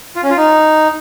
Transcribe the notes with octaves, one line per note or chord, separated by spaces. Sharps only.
F4
C#4
F4
D#4